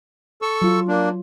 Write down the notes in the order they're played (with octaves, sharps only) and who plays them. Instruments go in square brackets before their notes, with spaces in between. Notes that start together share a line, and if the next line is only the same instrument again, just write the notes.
[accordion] A4 C#6 E6
[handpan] F#3 F4
[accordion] A#3 D4